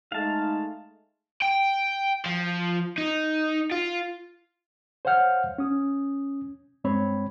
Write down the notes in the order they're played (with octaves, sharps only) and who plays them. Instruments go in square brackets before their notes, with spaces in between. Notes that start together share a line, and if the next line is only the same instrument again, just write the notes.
[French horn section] G#3 A3 D#4 [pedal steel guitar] F5 A5
[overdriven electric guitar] G5
F3
D#4
F4
[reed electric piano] C5 C#5 F5 F#5 F6 G6
C#4 D#6
G2 G#3 C4 C#5 B5